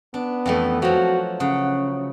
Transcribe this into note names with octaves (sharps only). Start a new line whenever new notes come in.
B3 D4
F2 E3 A3
F3 F#3 F#4
C#3 F#5